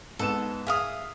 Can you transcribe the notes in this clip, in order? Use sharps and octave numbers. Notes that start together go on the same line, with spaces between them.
G#2 B3 A4 E7
G#4 E5 F5 D#6